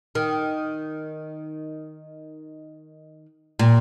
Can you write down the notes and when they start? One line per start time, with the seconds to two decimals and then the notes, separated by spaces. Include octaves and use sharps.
0.15 D#3
3.59 A#2